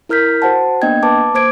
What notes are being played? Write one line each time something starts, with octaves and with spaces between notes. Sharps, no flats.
E4 A#4 F6 G6 B6
F#4 C5 F#5 A5
A#3 B3 D4 D#5 G5 G#6
B4 A5 D6
A#3 C5 D6 G#6 D7